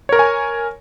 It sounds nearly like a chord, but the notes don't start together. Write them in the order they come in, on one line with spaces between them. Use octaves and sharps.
C#5 A#4 C#6 G#5